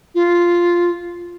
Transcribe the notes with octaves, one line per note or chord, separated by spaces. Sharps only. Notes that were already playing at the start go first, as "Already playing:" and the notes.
F4